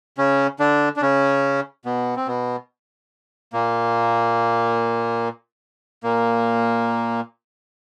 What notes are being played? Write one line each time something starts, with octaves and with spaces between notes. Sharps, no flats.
C#3 C#4
D3 D4
D4
C#3 C#4
B2 B3
C4
B2 B3
A#2 A#3
A#2 A#3